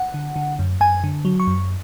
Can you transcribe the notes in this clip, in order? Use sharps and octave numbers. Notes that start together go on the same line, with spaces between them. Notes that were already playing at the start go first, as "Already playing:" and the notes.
Already playing: F#5
D3
D3
F#2
F#2 G#5
D3
F#3
C#6
F#2